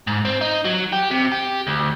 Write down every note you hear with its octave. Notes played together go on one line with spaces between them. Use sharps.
G#2
C4
D#4
F#3
G4
C3
G4
D2